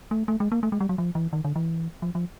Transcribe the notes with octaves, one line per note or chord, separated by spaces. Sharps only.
A3
A3
G#3
A#3
A3
G#3
G3
F#3
F3
E3
D#3
D3
E3
F3
F3